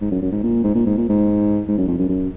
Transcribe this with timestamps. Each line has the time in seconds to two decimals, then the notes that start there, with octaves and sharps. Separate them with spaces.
0.01 G#2
0.11 F#2
0.22 F#2
0.32 G#2
0.43 A#2
0.64 G#2
0.75 A#2
0.86 G#2
0.97 A#2
1.09 G#2
1.68 G#2
1.78 F#2
1.88 F2
1.99 F#2
2.09 F#2